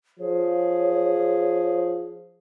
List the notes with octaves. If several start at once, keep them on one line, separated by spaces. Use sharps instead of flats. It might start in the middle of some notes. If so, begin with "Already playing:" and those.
F3 G#4 C#5